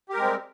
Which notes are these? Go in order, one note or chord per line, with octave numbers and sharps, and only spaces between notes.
G3 G#3 C4 G4 A#4